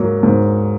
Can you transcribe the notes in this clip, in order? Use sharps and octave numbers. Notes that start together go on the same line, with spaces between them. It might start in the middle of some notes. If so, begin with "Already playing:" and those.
Already playing: G#2 F#3 A#3
G#2